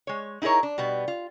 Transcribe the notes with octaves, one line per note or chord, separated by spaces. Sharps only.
G#3 C#5
D#4 E4 G#4 A#4 C#5
D4
B2 G3 B3
F4